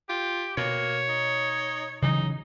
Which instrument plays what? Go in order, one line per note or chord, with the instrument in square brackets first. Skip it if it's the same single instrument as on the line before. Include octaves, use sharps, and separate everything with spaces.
[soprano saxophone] F4 [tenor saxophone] G4
[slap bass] B2 [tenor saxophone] A#3 [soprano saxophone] C#5
[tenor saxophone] D#4
[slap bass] C#3 E3 F#3 [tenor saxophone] D#4